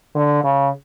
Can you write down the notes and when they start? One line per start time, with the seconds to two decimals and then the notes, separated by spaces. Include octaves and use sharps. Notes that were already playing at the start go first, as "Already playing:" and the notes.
0.15 D3
0.43 C#3